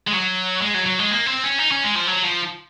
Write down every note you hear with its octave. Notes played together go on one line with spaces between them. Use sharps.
G#3
F#3
G#3
F#3
F#3
G#3
A#3
C4
C#4
D#4
C#4
G#3
F3
F#3
F3